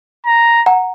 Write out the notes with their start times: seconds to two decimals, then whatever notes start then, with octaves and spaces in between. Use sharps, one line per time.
0.26 A#5
0.66 F#5 A#5